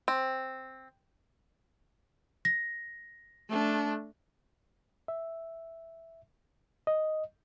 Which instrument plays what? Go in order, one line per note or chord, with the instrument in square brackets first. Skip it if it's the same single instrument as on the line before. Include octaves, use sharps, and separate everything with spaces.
[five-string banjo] C4
[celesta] A#6
[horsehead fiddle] A3 D4
[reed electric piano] E5
D#5